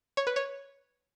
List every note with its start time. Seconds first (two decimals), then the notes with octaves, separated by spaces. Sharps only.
0.17 C#5
0.27 B4
0.36 C#5